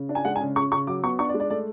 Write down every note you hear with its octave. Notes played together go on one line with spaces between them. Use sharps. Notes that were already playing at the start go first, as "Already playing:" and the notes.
Already playing: C#3
D4
G#5
G#3 F#5
G#5
C#3
C#3 C#6
C#3 C#6
F#3 D6
B3 C#6
D4 C#6
D5
G#3
D5
A3 D5